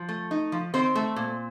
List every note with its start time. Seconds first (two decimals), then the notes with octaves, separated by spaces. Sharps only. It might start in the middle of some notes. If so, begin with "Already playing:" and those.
Already playing: F3
0.09 A3
0.31 D#4
0.52 F3
0.74 D#3 C4 C5
0.95 A3
1.16 A#2